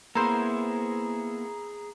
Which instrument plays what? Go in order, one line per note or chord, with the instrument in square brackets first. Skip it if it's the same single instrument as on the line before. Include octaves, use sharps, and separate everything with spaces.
[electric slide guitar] A#3 B3 [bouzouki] E4 C5 [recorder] G#4 [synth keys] A#5